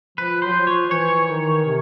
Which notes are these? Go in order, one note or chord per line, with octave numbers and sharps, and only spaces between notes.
F3 B4
F#3 C5
F3
C#5
F3
E3 C#5
D#3
C3